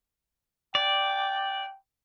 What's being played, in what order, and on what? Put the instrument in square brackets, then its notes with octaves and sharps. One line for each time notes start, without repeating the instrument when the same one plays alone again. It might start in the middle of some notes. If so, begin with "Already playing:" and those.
[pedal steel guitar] D5 [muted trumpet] G5